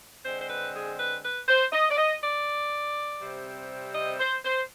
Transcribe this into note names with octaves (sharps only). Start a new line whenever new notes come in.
D3 G#3 C4 C5
C5
B4
G#4
B4
B4
C5
D#5
D5
D#5
D5
C3 G3 C4
D#5
C5
C5